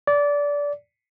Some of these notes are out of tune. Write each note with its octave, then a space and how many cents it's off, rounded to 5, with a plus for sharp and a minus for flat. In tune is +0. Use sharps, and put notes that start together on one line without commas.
D5 -20